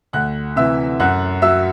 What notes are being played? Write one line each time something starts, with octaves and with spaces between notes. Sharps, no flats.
D2 F#5 F#6
C3 E3 E5 E6
F#2 F#5 F#6
F#3 E5 E6